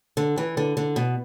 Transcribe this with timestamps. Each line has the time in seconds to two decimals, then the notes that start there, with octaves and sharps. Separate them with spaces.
0.17 D3
0.38 E3
0.57 D3
0.77 D3
0.96 B2